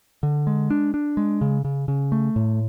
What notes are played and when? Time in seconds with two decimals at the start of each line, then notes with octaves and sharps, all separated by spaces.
0.23 D3
0.47 G#3
0.70 D4
0.94 D4
1.17 G#3
1.41 C#3
1.65 C#3
1.88 C#3
2.12 A3
2.36 A2